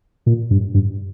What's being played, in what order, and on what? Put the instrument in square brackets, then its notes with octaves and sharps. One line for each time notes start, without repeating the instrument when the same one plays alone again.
[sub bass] A#2
G2
G2